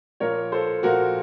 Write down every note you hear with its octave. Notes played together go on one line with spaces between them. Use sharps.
A#2 F3 A#3 A#4 C#5
A4 C5
A#2 F3 A#3 F#4 A#4